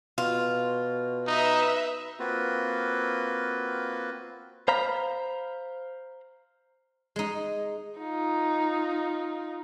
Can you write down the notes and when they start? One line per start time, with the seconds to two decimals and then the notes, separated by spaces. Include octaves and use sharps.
0.18 B2 F4
1.28 D#4 B4 E5
2.20 A#3 C4 F4 F#4 B4
4.68 C5 F5 A#5 B5
7.16 G#3 D#4
7.99 D#4 F4